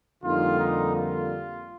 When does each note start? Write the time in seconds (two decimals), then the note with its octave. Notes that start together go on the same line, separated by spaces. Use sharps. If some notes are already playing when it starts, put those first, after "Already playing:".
0.24 F2 D3 G3 A#3 D#4 F4
0.59 D#4
0.96 F4